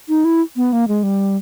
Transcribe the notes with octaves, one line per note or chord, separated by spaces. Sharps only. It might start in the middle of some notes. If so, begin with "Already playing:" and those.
D#4
E4
B3
A#3
G#3
G3